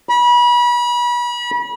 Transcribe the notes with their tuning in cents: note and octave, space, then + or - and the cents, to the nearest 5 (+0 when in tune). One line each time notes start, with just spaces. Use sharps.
B5 -35